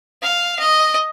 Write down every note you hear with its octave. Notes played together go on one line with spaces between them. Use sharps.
F5
D#5